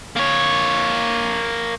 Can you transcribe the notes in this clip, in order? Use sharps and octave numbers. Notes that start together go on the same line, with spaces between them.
A#3 C#5